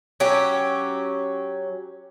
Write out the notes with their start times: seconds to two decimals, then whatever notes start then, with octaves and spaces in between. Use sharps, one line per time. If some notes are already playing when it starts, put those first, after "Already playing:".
0.20 F#3 C#4 G4